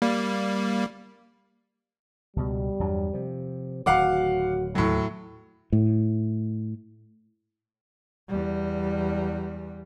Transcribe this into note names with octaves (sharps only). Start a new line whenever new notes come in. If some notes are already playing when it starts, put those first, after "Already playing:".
G3 A#3
C#2 B2 G3
E2 G2 F#3
C3 F3
D1 D#3 F#3 F#4 F5 F#5 D6
D#2 A2 D3 F#3
A2
E2 G3